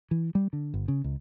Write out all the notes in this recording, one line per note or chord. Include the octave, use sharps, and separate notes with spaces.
E3
G3
D3
G1
C#3
C#2